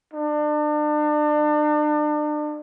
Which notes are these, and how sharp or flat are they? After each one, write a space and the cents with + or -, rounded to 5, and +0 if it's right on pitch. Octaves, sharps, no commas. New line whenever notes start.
D4 +35